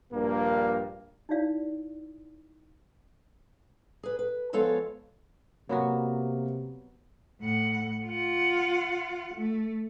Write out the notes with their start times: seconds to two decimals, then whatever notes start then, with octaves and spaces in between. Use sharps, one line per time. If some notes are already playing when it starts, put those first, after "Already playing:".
0.11 A#1 G2 A#3
1.29 D#4 E4 F#4 C#5 D5 F5
4.03 G#4 B4
4.19 B4
4.53 F3 G#3 B3 A4 C#5 F5
5.69 C3 F#3 A#3 B3 F#4
7.41 A2 F#5
8.06 F4 F#5
9.34 A3